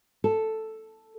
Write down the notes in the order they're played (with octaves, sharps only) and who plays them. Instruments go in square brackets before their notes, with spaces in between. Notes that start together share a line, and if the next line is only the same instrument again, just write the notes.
[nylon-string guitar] A4